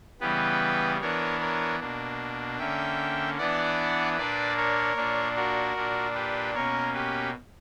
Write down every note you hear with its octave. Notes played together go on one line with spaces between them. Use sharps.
C#3 E3 G3 B3 G4 B4
E3 B3 D4 A#4 C#5
A#4 C#5
B2 A#3 D4
D3 A#3 C#4 E5 G5
E3 B3 D4 D5 F#5
A#2 A#3 D4 B4 D5
A#4 C#5
A#2 A#3 D4
F#4 A#4
A#2 A#3 D4
G4 B4
B2 A#3 C#4 A#4 C#5
G4 B4